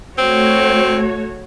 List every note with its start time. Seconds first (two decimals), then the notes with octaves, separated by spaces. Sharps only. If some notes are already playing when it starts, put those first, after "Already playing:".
0.18 A3 C4 F#4 C#5